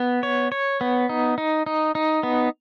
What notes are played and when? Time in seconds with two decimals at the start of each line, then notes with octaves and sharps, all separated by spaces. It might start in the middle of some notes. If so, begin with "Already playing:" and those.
Already playing: B3
0.23 C#5
0.52 C#5
0.81 B3
1.09 D#4
1.38 D#4
1.66 D#4
1.95 D#4
2.23 B3